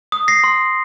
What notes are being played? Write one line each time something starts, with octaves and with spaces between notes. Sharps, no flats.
D#6
A#6 C7
C6